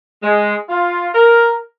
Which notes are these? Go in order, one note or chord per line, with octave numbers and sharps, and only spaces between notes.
G#3
F4
A#4